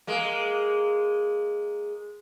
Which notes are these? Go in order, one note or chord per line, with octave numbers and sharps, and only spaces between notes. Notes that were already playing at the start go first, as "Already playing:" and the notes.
G#3 A#3